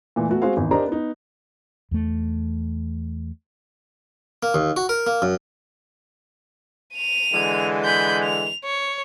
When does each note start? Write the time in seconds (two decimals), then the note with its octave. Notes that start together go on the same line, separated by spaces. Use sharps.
0.16 A#2 E3 A3
0.29 A3 B3 F#4
0.42 G#3 C4 F#4 G#4 C5 F5
0.57 G#1 E2
0.71 D4 G4 A#4 C5 D#5 A#5
0.88 B3 D#4
1.91 E2 A3
4.43 A#3
4.54 D#2
4.76 F#4
4.89 A#4
5.07 A#3
5.22 F#2
6.95 D#7 F7
7.33 D3 E3 G#3
7.85 B5 G6
8.23 F7
8.65 C#5